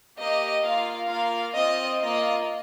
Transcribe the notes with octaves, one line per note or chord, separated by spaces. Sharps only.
A#3 G4 D#5
A#3 F4 F5
A#3 F4 F5
C4 F4 D#5
A#3 F4 D#5